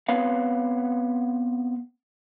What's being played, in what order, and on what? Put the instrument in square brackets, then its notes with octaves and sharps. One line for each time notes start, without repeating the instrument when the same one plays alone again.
[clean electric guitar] B3 C4 B4 C#5 F5